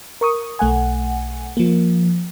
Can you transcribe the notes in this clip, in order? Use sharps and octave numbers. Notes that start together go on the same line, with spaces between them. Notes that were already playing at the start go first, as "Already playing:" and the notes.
A#4 C#6 D#6
B1 A3 F#5 G#5
F3 A#3